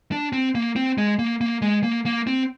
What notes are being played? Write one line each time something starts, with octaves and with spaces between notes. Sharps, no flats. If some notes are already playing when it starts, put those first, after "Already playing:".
D4
C4
A#3
C4
G#3
A#3
A#3
G#3
A#3
A#3
C4